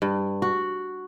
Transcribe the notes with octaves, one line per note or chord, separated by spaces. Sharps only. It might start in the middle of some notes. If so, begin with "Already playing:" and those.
G2
F#4